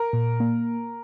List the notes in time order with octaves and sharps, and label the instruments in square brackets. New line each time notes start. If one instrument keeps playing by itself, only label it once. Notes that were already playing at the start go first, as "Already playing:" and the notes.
Already playing: [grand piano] A#4
[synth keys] A#2
A#3